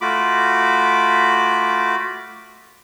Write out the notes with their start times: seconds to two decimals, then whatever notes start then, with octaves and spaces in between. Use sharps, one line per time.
0.01 A3 F4 F#4 B5 D6